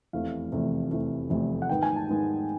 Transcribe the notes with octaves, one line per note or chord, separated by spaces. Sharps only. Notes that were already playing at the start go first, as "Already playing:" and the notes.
F1 E2 C3 E3 A3 F5
F1 E2 C3 E3 A3
F1 E2 C3 E3 A3
F1 E2 C3 E3 A3
F#5
G#2 D#3 G#3 B3 G5
G#5
A5
G#2 D#3 G#3 B3